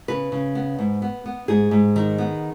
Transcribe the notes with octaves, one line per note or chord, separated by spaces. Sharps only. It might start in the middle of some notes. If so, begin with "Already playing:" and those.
C#3 B4
C#3
B3
G#2
B3
B3
G#2 G#4
G#2
D#3
B3